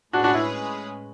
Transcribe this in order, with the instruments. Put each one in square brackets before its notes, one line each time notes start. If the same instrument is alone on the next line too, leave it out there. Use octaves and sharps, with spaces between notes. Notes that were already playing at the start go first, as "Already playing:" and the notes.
[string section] A2 G#3 C#4 G#4 B4 [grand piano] D4 F#4
[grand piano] D4 F#4
E4